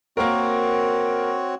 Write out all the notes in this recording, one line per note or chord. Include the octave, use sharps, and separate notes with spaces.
A#3 C4 F#4 A#4 C#5